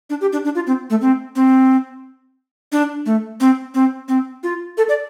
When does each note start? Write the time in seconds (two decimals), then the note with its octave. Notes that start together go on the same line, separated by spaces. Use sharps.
0.10 D4
0.21 G4
0.33 D4
0.45 D4
0.55 F4
0.67 C4
0.90 A3
1.01 C4
1.36 C4
2.72 D4
3.06 A3
3.40 C4
3.74 C4
4.08 C4
4.43 F4
4.78 A4
4.89 D5